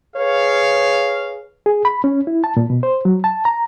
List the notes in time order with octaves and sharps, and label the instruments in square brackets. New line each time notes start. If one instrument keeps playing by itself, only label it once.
[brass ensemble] G#4 B4 C#5 F5
[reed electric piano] G#4
B5
C#4
E4
A5
A#2
B2
C5
F#3
A5
A#5